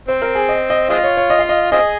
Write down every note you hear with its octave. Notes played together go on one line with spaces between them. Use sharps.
C4 C5
A#4
G#4
D#5
D#5
G#3 C4 F4 D#5
C#5
C#5
D#5
F5
D#5
C4 F4 G#4 D#5